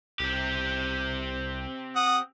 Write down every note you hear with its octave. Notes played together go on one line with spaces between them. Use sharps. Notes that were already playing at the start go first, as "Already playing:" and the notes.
C2 C4 G4
F#5 D#6